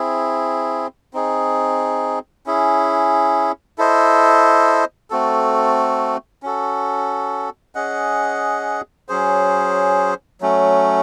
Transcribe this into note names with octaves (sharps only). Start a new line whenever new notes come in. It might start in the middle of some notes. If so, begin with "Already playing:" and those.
Already playing: C4 E4 G#4
C4 D#4 G#4
C#4 E4 G#4
E4 A4 C5 D#5
A3 C4 F#4 A4
C#4 F#4 A4
C#4 G#4 D#5 F#5
F#3 C#4 G#4 C5
F#3 A3 C#4